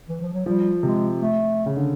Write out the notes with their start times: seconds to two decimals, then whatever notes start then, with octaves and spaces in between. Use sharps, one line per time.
0.09 E3
0.21 F3
0.33 F#3
0.46 F3 G3
0.83 C3 G#3
1.20 A3
1.66 C#3
1.76 D3